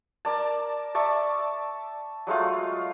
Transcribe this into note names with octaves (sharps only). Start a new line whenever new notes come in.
A#4 D5 A5
D5 E5 A5 C#6
F#3 G#3 A3 F4